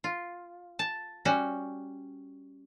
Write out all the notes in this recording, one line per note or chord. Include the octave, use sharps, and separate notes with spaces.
F4
A5
G3 C#4 F#4